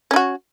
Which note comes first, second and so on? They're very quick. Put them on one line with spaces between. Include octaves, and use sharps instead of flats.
C#4 D#4 F#4